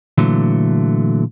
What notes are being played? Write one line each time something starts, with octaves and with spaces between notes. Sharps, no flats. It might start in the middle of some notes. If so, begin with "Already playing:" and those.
A#2 D3 E3 F#3 A3